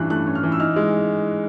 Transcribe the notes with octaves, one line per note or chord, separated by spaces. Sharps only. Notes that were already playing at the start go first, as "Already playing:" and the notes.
Already playing: G2 E3 C#4 F#6
A3 F#6
C#4
F6
E3
E6
D#4 F6
G#3